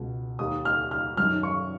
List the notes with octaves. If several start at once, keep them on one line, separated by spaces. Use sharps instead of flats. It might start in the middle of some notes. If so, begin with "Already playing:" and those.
Already playing: C#2 B2
D#2 D#3 D#6
F6
F6
F#2 D#3 F6
C#6